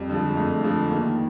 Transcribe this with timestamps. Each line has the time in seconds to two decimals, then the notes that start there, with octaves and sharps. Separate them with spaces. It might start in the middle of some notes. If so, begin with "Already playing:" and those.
Already playing: F2 G3
0.09 D3 F3 G#3
0.37 F2 A3
0.64 D3 F3 G#3
0.92 D#3 A#3